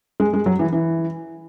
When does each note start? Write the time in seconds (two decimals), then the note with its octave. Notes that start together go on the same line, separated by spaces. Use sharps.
0.20 G#3
0.33 G#3
0.46 F#3
0.59 E3
0.73 E3